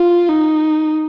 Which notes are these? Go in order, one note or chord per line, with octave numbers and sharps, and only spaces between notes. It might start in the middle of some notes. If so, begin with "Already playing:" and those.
Already playing: F4
D#4